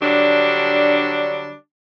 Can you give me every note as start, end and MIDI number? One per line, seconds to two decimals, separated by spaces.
0.02 1.54 50
0.02 1.54 54
0.02 1.54 55
0.02 1.54 62